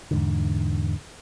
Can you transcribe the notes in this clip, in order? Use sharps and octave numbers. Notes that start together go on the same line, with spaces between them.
E2 G#2 D3